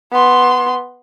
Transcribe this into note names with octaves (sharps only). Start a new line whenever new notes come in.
B3 C6